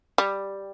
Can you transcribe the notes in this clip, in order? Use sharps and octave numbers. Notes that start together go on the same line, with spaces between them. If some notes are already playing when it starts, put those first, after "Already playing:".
G3